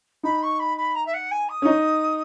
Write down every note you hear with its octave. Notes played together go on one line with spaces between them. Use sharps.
D#4 B5
C#6
B5
B5
A#5
E5
F#5
G#5
D#6
C#4
D#4